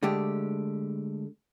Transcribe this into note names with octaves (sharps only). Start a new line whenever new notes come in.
D3 G#3 A3 G4